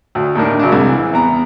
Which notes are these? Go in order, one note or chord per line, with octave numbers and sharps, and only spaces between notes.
D2
D#2 A2 D#3 D4
F#2 C#3 D4
C2 G#3
E3
E2 A#5